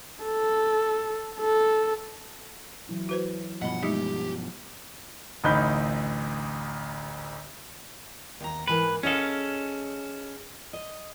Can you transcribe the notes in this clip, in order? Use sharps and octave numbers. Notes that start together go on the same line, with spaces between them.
A4
A4
E3 F#3 E4
F#4 B4 C5
G2 B2 F3 D#5 F#5 B5
G#3 A3 D#4 G4
A1 D2 D#4 B5 G6
D#2 A#5
G#2 E3 A#3 B4
C#4 G#4 A4 D#5 F5
D#5